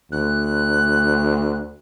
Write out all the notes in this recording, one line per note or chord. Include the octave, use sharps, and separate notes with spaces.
D2 F#6